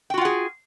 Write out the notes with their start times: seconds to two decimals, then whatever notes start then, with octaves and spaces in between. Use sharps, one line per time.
0.10 G5
0.14 F#4
0.18 F4
0.21 F#5
0.25 G#4